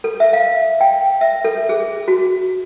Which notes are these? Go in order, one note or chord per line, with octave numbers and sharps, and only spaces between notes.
A4
E5
F5
G5
E5
A4
G#4
F#4